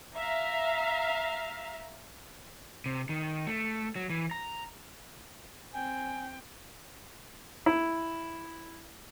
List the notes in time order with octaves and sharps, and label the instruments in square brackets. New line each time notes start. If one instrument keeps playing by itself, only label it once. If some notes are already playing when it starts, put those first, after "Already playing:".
[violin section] E5 F5 A#5
[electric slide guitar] C3
D#3
A3
F#3
E3
A#5
[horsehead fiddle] C4 G5 [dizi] G#5
[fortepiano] E4